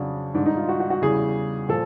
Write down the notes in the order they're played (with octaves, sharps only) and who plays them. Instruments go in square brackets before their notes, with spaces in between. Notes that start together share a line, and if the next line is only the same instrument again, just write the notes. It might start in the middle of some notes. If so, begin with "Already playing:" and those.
Already playing: [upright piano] F2 C#3 F#3 D4
G#2 D#3 G3 D4
D#4
F4
F#4
F#4
F#4
E2 C#3 E3 G3 G#4
A#2 F3 A4